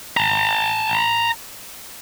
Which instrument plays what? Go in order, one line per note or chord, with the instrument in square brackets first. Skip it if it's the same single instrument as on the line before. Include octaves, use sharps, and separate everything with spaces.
[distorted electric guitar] A5 A#5